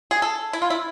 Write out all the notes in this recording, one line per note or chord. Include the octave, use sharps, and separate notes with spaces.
G#4
A4
E4
F4
E4